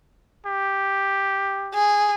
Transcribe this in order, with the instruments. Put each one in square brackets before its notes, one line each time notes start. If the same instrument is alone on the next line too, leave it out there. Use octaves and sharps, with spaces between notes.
[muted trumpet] G4
[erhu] G#4